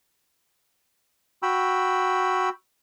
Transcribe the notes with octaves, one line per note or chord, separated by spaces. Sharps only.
F#4 G5 B5 E6